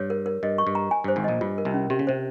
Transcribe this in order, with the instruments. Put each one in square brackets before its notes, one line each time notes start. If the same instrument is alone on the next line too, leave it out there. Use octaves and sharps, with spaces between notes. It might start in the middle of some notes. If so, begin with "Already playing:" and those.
Already playing: [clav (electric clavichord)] G2 [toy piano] C#5
[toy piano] A#4
A#4
[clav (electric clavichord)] G2 [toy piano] D#5
[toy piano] C#6
[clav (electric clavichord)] G2
[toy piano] A#5
G#5
[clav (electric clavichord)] G2 [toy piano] C5
[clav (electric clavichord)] G#1 G#2
[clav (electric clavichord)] A#1 A#2 [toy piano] D#5
[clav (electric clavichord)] G2 [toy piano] F4
[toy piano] A#4
[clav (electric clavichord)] C2 C3
[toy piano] C#4
[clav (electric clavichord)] C3 [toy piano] G4
[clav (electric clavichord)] C#3
[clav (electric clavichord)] C3 [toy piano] C5